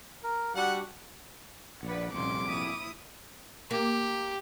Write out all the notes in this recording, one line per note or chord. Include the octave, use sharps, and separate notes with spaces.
A#4
G3 D4 F#4 F#5
A#1 B4 D5 F#5
C2 F2 A#2 C#3 G3 C6 D6
A#1 G#2 E4 D#6
A#3 G4